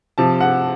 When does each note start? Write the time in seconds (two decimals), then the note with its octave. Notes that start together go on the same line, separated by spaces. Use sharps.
0.18 C3 F3 A5
0.40 F#5